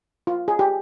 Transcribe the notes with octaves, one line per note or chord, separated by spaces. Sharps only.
F4
G#4
G4